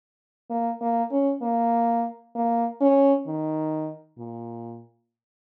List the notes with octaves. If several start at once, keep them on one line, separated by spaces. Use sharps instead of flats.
A#3
A#3
C#4
A#3
A#3
C#4
D#3
A#2